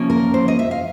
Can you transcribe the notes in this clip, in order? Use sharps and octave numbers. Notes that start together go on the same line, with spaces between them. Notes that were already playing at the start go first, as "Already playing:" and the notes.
Already playing: C3 F3 A#3 C#4
A#4
C5
D#5
E5
F5